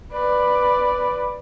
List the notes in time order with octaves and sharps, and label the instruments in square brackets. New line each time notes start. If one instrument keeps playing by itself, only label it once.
[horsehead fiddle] B4 D5